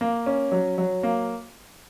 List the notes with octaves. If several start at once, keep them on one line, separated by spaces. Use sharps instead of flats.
A#3
C#4
F#3
F#3
A#3